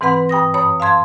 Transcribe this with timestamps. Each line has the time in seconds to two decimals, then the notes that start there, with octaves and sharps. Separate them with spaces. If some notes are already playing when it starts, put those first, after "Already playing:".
0.01 G#2 E3 C4 B4 F#5 B5
0.29 G2 G5 D#6 A#6
0.54 F#2 C#5 B5 D#6
0.80 F5 A5 C6 G#6